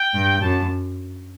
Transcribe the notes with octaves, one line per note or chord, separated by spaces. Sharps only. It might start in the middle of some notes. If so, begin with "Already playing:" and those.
Already playing: G5
G2
F#2 A5